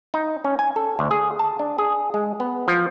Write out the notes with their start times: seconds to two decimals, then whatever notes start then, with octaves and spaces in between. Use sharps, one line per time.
0.14 D#4
0.44 C#4
0.59 G#5
0.76 A4
0.99 D2
1.11 G#4
1.39 A5
1.59 D4
1.78 G#4
2.14 G#3
2.40 B3
2.68 F3